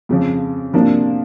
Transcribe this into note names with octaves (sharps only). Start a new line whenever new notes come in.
F2 C#3 F3
C3 F3 A#3 D4